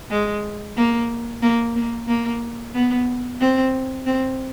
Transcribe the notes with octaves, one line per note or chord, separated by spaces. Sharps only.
G#3
A#3
A#3
A#3
A#3
B3
C4
C4